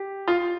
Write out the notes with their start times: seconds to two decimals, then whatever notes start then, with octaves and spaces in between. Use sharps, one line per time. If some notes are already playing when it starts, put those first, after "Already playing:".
Already playing: G4
0.28 F4